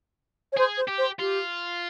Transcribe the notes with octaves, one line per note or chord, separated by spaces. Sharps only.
C#5
G#4 C5
C5
G4
C5
F4 G4